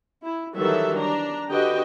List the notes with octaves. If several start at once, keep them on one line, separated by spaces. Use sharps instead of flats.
E4
D#3 E3 F#3 G3 A4 E5
D4 A#5
D3 F#4 G4 B4 D#5 G5